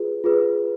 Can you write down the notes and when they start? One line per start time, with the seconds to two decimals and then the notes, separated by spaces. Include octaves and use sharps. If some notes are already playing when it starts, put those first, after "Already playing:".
Already playing: F4 G#4 B4
0.24 F4 G#4 B4